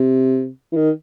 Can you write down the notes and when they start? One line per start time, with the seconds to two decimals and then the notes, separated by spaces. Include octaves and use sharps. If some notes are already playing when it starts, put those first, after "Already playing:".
Already playing: C3
0.72 E3
0.76 D#3